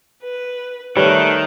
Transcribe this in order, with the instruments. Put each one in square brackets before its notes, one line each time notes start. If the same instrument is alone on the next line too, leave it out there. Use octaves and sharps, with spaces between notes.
[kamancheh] B4
[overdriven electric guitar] D#3 [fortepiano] G3 B4 C#5 [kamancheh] A3 F#6